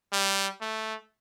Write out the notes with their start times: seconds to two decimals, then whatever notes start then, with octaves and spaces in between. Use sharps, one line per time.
0.13 G3
0.61 A3